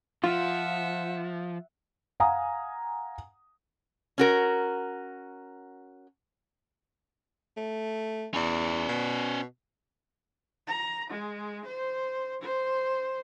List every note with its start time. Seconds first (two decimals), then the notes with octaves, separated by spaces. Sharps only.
0.24 F3 F4 E5 F#5
2.20 F5 F#5 G#5 A#5 D#6
4.18 C#4 F#4 A#4
7.57 A3
8.34 E2 C#4 D5
8.88 B2
10.67 A#5
11.10 G#3
11.65 C5
12.41 C5